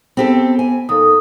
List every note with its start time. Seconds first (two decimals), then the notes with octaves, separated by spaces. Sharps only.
0.17 B3 C4 G4 A4
0.59 G#5
0.89 D#2 A4 D#6